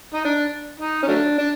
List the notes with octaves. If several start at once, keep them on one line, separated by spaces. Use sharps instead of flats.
D#4
D4
D#4
C#4
F#3 A3 D4
D4